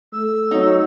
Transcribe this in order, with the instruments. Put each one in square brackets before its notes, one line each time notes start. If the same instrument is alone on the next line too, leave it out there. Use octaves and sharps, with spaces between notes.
[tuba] A3 [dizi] E6
[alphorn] F#3 [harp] D#4